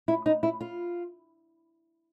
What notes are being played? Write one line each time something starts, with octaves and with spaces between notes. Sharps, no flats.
E4
D#4
E4
F4